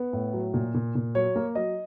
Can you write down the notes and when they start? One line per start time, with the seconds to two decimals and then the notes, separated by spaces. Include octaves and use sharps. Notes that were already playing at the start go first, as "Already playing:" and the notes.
Already playing: B3
0.13 A2
0.33 F#3
0.54 A#2
0.74 A#2
0.95 A#2
1.15 F#3 C#5
1.36 A#3
1.55 F#3 D#5